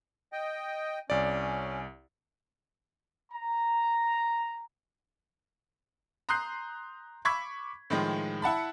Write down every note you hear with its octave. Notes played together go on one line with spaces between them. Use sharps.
D#5 G5
C2 C#4 D5
A#5
A#5 C6 D#6 F#6 G6 C7
B5 C#6 D6 E6 G#6 B6
A2 D#3 F3 G#3
E4 F#5 A5 B5